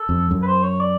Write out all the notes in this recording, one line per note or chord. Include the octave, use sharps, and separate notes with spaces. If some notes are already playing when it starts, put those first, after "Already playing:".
Already playing: A4
F2
F#2
B4
C5
C#5
D5